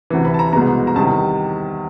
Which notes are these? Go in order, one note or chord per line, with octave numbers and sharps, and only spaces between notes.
D2 C3 E3
B5
A5
A#5
C2 B2 G#3 B3 A#5
A#5
E2 C3 D#3 G3 A5